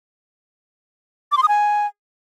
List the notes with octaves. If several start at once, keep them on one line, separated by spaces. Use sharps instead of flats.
D6
C6
D#6
G#5